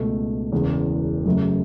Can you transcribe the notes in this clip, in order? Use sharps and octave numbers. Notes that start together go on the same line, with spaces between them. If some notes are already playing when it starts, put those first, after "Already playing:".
Already playing: C#2 B2 A3
E1 E2 C#3
F#2 C#3 F#3 A3